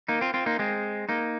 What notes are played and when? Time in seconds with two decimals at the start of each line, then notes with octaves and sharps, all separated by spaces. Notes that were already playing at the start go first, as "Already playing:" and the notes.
0.08 A#3 D#4
0.21 C4 F4
0.34 C4 F4
0.46 A#3 D#4
0.59 G#3 C4
1.09 A#3 D#4